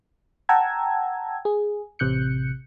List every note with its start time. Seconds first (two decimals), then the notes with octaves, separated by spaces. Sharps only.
0.49 F#5 G5 A5 A#5 E6 G#6
1.45 G#4
1.99 A1 C3 F#6 G6 C#7